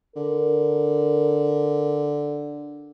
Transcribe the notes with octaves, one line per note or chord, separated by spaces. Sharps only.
D3 A#4